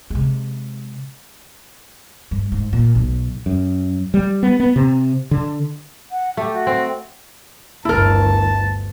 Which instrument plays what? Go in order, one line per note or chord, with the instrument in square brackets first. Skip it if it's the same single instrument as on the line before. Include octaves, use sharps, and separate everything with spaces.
[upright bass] C3 G#3
G2
G#2
A#2
B1
[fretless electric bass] F#2
G3
B3
B3
C3
D3
[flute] F#5
[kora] A3 [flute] G4
[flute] F#4
[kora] C4
[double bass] G1 D2 [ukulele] E4 A#4 [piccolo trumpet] A5